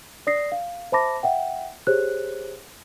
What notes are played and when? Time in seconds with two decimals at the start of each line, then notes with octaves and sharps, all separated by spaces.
0.27 D5 D#6 A#6 C7
0.52 F5
0.92 C5 E5 A5 B5 D6 A#6
1.23 E5 F#5 G5
1.87 G4 G#4 C5 C#5 F#6